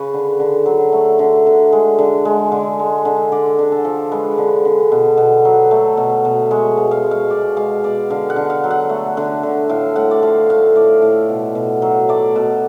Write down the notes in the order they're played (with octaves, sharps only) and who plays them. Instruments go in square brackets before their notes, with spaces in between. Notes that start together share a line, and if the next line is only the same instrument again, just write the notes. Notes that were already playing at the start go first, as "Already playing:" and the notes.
Already playing: [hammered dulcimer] C#3 B4 C#5
D3
D3
F#3
A3
D3
D3
G#3
D3
G#3
D3
G#3
D3
D3 D5
D3
A4
F3
G#3 B4
D3
D3
B2
B2
F#3
A3
B2
B2
G#3 C#5
B2
F5
G#3
F5
B2 D5
G#3 F5
B2 D5
D3 F5
F#5
D3
F5
F#3
F#5
A3
D3
D3
A2 F5
A2 F#5
D5
F3 F5
A3 F5
A2 D5
A2
B2
B2
F#3
A3 D5
B2